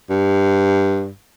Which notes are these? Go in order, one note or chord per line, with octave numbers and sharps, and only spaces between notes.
G2